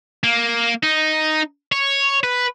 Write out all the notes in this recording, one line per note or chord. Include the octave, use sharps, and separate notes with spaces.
A#3
D#4
C#5
B4